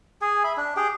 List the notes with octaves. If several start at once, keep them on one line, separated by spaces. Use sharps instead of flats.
G#4 G#5
E5 B5
D4
G4 G#4 G5